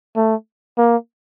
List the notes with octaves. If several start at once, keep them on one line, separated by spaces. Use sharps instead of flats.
A3
A#3